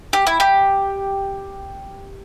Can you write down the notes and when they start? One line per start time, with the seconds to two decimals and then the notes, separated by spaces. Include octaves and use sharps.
0.13 G4
0.27 E4
0.40 G4